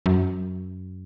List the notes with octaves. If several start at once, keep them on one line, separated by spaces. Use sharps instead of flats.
F#2